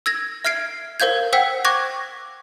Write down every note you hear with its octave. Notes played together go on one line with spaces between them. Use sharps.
E6 G#6 A#6
E5 F6 G#6 C7 D7
A#4 C5 F5 G6 G#6
C5 F#5 G5 E6 B6
C#6 D6 F#6 G#6 A#6